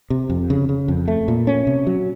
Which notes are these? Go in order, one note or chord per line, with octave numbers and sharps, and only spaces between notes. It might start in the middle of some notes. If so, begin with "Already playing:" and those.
C3
F2
C#3
C#3
F2
A3
A#2
C#4
C3
F#3